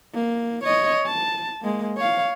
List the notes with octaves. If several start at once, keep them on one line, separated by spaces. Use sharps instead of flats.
A#3
C#5 D#5
A5
G#3 A#3
C#5 F5